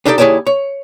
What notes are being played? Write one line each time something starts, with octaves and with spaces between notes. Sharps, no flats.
B3 D4 D#4 G4 A4 D5
D#2 E4 G#4 C#5 D5 A5
C#5